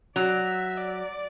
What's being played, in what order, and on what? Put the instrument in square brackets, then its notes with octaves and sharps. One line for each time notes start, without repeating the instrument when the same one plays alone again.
[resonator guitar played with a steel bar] F#3 [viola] D5
[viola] E5
D5